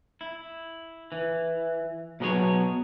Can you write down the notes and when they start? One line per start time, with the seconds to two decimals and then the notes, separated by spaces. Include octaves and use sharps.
0.21 E4
1.12 E3
2.20 B2 F#3 B3 G#4 C#5